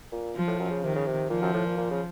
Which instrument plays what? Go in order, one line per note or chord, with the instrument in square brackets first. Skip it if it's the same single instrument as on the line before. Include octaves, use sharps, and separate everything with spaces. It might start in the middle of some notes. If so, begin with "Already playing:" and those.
[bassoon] A#2
[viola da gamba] F3
[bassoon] A2
F#2
C#3
[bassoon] C3 [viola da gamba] D#3
[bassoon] C#3
C3
[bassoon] A#2 [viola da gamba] F3
[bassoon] F#2
A2
A#2
A#2
C#3